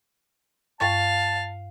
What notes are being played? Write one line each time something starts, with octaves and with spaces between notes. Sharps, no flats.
G2 F5 A5 C#6 A6